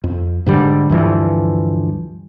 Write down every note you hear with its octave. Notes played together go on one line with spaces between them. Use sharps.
F2
G#2 D3 G3
D2 G2 E3 F3